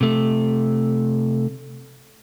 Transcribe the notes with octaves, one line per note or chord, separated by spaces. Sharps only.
C3 A3